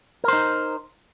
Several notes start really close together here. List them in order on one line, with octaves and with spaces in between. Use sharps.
A#4 C5 D#4